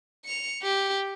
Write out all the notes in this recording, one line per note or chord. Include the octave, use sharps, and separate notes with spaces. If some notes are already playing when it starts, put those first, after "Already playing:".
C#7 F7
G4